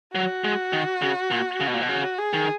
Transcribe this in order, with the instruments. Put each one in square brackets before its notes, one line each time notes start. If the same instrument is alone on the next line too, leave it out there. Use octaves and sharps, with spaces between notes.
[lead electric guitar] F#3 [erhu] F#4
[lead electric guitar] G#3
D#3
C#3
A#2
C#3
B2
A#2
B2
[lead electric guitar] C#3 [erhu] F#4
[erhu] G#4
[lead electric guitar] D#3